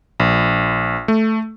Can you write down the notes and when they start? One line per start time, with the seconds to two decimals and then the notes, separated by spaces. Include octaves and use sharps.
0.20 A#1
1.08 A3